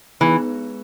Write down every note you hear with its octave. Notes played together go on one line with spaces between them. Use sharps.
E3 G#3 B3 D#4 G#4 B4